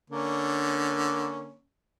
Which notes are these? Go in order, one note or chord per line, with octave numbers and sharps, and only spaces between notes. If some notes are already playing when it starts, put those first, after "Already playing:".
D3 A#3 C#4